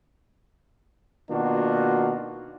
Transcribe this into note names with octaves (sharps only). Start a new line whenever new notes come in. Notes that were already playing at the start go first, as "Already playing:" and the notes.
B2 D#3 A#3 D4 F4 F#4